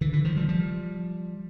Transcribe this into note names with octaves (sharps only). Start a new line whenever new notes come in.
D3 E3
D3 E3
D#3 F3
F3 G3
F3 G3